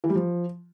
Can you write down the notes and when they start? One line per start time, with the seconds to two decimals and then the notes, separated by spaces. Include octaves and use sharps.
0.04 E3
0.10 G3
0.16 F3